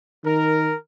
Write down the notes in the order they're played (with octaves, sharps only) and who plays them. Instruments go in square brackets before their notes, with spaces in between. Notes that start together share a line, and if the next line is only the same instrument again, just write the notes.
[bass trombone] D#3 [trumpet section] A#4